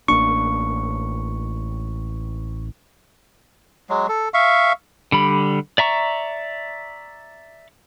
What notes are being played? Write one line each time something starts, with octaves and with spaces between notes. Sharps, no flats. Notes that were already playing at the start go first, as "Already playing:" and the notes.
A1 A#3 D4 C#6
F#3 G#3
A4
E5 F5 C#6
D3 G3 B5
D5 E5 A#5 C#6